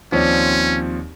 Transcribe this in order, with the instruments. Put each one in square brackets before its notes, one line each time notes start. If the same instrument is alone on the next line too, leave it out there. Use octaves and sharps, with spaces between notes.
[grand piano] D#2 C#5 D5 [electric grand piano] F3 C4 [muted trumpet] C#4